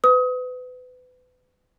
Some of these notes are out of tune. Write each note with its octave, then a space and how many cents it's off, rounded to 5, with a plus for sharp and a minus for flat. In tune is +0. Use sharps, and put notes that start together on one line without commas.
B4 +30 D#6 +25